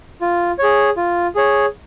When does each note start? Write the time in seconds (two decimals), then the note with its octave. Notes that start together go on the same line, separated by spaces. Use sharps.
0.21 F4
0.59 G#4 C#5
0.97 F4
1.36 G#4 C#5